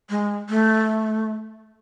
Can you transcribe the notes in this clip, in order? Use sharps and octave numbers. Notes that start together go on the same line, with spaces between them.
G#3
A3